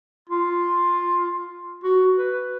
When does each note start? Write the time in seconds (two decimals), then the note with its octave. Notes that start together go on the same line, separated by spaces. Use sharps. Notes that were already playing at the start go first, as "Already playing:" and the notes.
0.29 F4
1.84 F#4
2.16 B4